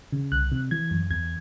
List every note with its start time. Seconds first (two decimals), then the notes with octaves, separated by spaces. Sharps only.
0.12 C#3
0.32 C2 F#6
0.52 C3
0.71 E3 G#6
0.91 F#2
1.11 E2 G#6